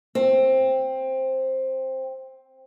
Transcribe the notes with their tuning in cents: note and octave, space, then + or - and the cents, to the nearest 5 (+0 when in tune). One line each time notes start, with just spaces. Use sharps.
C4 +10